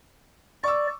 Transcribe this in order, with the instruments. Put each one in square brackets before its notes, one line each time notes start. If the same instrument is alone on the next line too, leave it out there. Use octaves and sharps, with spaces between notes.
[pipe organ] D5 [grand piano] C#6 D6 E6